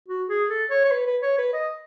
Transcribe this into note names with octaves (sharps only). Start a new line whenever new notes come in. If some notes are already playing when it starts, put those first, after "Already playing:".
F#4
G#4
A4
C#5
C#5
B4
B4
C#5
B4
D#5